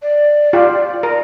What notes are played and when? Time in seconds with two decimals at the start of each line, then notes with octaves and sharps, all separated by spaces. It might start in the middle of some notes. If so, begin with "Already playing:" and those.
0.02 D5
0.53 F4 G4
1.03 A#4